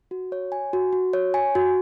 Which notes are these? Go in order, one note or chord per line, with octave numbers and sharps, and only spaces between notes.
F#4
C#5
G#5
F#4
F#4
C#5
G#5
F#4